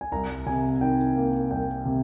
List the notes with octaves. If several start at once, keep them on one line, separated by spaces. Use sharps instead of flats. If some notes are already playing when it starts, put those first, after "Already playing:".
G#5
C2 A#5
C3 G#5
D#3 G5
A#3
C2 G5
C3